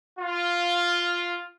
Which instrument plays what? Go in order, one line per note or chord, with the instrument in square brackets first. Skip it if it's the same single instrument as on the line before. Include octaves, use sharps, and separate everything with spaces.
[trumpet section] F4